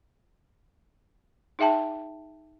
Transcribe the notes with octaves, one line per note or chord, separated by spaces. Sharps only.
D#4 G#4 E5 G5 A5